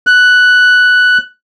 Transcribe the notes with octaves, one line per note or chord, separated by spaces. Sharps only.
F#6